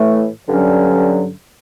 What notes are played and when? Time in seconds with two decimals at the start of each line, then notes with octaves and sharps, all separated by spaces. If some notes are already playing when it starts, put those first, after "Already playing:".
Already playing: A2 E3 A3
0.48 G2 D3 F#3 C#4